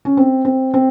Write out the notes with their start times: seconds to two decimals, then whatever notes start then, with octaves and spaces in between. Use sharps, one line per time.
0.05 C#4
0.17 C4
0.45 C4
0.74 C4